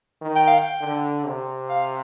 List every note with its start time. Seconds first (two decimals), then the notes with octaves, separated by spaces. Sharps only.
0.21 D#3
0.36 G5
0.47 F5
0.59 G5
0.81 D3
1.26 C3
1.70 F5